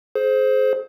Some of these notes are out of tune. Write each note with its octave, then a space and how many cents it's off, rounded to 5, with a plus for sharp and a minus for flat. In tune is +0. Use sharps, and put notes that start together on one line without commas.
G#4 +40 C5 +0